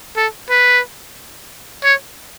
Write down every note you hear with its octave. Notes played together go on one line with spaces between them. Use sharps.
A4
B4
C#5